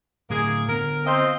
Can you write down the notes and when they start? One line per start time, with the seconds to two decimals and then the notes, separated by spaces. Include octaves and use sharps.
0.30 A2 D3 A#3 G#4
0.68 D3 B3 A#4
1.06 C4 F4 C5 D#5